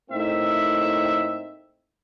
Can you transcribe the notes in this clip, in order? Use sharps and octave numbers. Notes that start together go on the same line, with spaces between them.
A2 A#3 C4 D#4 E5